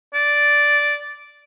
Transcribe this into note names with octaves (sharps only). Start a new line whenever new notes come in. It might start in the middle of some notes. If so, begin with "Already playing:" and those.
D5